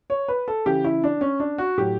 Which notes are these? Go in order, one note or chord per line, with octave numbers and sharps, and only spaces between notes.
C#5
B4
A4
C#3 E3 G4
E4
D4
C#4
D4
F#4
A2 F#3 G4